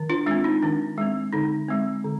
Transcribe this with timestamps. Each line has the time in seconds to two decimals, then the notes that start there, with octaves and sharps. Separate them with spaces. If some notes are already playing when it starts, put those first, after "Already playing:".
Already playing: D#3
0.09 D4 F4
0.26 G#3 D4
0.31 C4
0.44 D#4
0.63 D#3 D4
0.98 G#3 C4
1.33 D3 D#4
1.68 G#3 C4
2.04 D3